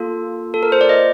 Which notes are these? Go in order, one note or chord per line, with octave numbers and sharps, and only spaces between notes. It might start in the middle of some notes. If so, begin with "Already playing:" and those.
Already playing: A#3 F4 A4
A4
A#4
C5
D5
D#5